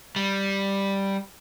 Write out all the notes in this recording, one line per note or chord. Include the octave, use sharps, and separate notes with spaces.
G3